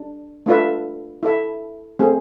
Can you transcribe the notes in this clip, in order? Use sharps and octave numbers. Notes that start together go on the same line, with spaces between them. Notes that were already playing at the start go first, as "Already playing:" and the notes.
Already playing: D4
A3 D4 F4 B4 E5
E4 A4 E5
A3 C4 G#4